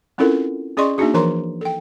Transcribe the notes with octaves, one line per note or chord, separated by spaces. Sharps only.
C4 C#4 E4 F4 A4 A#4
C#4 G#4 D5 D#5 C6 C#6
A#3 D4 D#4 F#4 G#4
E3 F3 A#4 C#5 A#5 C6
A4 G5